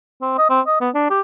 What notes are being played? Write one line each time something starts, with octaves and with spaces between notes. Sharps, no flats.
C4
D#5
C4
D#5
B3
D4
G4